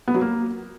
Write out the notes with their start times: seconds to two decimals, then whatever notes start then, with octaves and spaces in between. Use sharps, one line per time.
0.08 B3
0.14 F#3
0.21 A#3